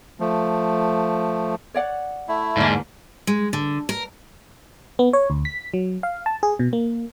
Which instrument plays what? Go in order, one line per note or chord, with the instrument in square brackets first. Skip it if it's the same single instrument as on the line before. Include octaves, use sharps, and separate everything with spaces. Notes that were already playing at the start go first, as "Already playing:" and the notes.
[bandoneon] F3 A3
[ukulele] C#5 D5 F#5
[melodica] A3 E4
[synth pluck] E2 D3 A#3 [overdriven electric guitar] G#2
[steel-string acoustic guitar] G#3
D3
A#4
[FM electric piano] B3
C#5
D2
B6
F#3
F5
A5
G#4
B2
A#3